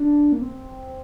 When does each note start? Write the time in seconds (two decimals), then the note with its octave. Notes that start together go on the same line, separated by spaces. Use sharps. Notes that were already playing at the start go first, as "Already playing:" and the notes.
Already playing: D4
0.32 A#3
0.42 C4